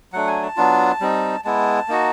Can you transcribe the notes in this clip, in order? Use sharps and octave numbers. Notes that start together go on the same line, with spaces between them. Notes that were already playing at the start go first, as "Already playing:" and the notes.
F#3 A3 D4 F#5
G#5
A5
F#3 B3 D4 F4
G3 C4 D#4
G#3 B3 E4 A5
A#3 D#4 F#4